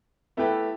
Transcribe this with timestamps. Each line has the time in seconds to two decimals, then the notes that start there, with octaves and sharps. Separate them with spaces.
0.37 A3 B3 E4 G4 B4